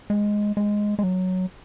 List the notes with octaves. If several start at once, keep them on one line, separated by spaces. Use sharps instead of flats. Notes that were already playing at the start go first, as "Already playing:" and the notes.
G#3
G#3
G#3
F#3